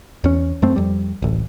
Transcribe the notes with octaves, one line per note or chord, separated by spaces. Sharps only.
E2 C#4
F#2 A3 C4
F2 G3
D1 A1